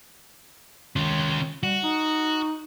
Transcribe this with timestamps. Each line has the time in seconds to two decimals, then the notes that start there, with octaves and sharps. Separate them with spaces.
0.96 D#3 C#4 F4
1.63 G3 F#4
1.83 D#4